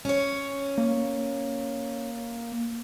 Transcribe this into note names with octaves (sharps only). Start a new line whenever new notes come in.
C#4 C#5
A#3